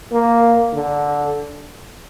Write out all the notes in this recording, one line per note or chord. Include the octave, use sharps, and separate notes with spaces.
A#3
D3